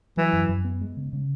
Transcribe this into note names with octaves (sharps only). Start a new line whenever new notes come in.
E3 F#3
F#2
F#2
B3
G#3
C#3
C#3